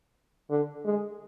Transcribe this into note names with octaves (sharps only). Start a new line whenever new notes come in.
D3
G#3